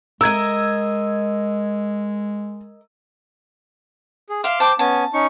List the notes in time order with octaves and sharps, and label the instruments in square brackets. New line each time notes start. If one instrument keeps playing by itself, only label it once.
[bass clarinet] G#3 [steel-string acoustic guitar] A#4 D#5 [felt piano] E6 G#6
[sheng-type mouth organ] G#4
[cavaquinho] E5 F5 [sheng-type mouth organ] C6 D6 F6
[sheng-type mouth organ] C5 G5 [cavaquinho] A5 D6
[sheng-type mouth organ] B3 C#4 G#5 [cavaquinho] A5
[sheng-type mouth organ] C#4 D#4 C#6